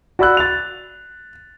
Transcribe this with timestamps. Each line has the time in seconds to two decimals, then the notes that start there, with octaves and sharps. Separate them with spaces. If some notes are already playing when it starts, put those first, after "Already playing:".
0.19 F#4 D5 B5 E6 F#6
0.37 A6 F7